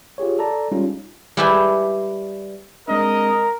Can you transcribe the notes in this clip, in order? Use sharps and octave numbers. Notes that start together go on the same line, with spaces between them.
F4 G4 G#4 C#5
A4 D5 A5 A#5
G3 G#3 C#4 D#4 F4
G3 E4 G4 B4 E5 G#5
G#3 C4 D4 A#4 D#5